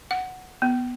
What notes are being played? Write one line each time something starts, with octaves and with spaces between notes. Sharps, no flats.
F#5
B3